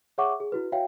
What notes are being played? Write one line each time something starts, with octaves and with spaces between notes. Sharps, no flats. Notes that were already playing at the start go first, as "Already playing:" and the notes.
G#4 C#5 E5 F#5 C#6 D6
G#4
E4 F#4 B4
F#4 C#5 E5 F5 G5